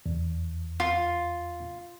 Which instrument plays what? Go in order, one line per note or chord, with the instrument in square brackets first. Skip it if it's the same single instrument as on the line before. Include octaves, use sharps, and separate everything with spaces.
[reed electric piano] E2
[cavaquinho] F4